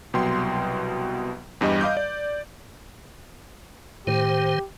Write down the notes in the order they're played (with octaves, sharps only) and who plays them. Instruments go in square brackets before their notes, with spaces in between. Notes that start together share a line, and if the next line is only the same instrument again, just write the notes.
[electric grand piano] C2 B2 F#3 G5 C6
E2 G2 G3 D#5
D#5 F5 D6 G6
D5
[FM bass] A2 [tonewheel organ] D#3 C5 [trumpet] G4